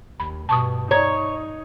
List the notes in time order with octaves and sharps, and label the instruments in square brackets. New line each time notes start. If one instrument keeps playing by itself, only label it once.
[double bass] D#2 [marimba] B5
[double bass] G2 B2 [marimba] A5 C#6 D#6
[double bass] D#4 [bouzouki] C#5 [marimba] A#5 G#6